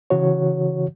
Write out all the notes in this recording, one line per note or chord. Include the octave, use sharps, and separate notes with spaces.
C#3 E3 F#4 C#5